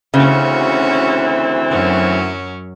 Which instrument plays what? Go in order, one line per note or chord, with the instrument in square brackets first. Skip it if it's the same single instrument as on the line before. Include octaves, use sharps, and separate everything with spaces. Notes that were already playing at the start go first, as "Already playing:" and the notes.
[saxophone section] D2 E3 C4 [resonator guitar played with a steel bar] C#3 [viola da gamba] C#4 F#4
[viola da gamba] F#2 F#3 C#4